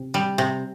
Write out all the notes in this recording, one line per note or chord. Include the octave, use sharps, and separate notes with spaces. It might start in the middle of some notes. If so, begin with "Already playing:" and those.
Already playing: C3
G3
C3